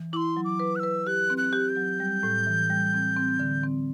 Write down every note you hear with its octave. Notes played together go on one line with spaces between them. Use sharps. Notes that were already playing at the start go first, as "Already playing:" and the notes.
Already playing: E3
E4 C6 D6
F#3
D6
B4
F#6
B4 E6
G4 F#6
C4
F#6
G4
G6
F#3
G3
A2
E3
G3
C4
C4
D3
C4